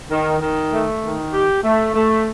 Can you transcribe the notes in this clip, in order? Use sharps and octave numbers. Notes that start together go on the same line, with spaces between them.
D#3
D#3
A3
D#3
G4
A3
A3